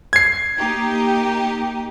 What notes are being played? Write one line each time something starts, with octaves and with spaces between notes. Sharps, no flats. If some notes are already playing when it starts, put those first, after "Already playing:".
G#6 C7
A#3 D#4 G4